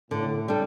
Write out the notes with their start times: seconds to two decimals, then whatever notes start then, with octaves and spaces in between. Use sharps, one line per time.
0.11 A2 D3
0.48 G3 D4 A4